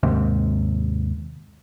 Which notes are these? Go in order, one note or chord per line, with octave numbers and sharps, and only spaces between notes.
D#2 G#2 C3